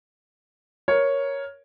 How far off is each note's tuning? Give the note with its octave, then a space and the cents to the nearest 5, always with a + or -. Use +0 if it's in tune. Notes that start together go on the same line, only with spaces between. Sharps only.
A#4 +10 C#5 +0